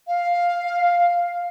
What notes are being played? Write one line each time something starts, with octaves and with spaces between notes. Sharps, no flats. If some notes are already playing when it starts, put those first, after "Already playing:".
F5